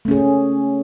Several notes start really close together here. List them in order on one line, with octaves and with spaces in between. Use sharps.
A3 C#4 G#4